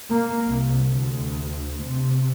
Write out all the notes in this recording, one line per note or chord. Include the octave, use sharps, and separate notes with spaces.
A#3
C2
D2
C3